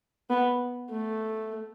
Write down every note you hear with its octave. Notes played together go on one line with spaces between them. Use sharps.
B3
A3